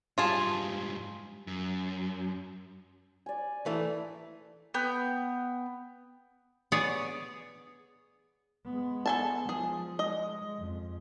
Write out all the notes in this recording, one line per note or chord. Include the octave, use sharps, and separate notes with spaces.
G#2 G3 F4 G#4 A5
F#2
D5 G#5
E3 A3 E5 A#5
B3 G5
B3 G#4 C#5 D5
G#3 B3
A4 G#5 A5
F3 G#4
G#3 D#5
F2